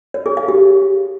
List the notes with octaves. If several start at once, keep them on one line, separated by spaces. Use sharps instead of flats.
C#5
G#4
F5
G4